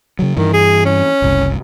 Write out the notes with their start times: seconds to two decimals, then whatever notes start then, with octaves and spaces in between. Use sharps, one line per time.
0.19 C#3 F#3
0.37 G2 D#3 E3
0.53 G#4
0.86 C#4
1.22 F#1 C2